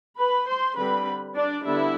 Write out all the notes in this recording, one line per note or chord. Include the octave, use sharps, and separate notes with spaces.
B4 B5
C5 C6
D3 G3 C4 B4 B5
D4 D5
D3 G3 B3 D4 E4 E5